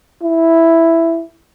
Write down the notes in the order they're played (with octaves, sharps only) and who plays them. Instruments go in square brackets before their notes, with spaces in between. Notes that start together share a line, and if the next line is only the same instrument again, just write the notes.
[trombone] E4